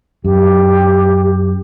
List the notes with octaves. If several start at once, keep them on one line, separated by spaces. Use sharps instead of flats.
F#2 G4